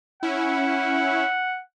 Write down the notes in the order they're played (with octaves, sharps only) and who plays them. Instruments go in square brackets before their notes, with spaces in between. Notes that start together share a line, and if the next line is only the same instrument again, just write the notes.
[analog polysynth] C#4 E4 [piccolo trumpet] F#5